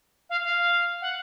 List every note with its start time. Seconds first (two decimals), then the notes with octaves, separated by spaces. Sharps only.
0.29 F5
0.43 F5
1.01 F#5